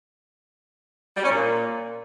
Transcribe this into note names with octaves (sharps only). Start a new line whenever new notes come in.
G3
C#4
A#2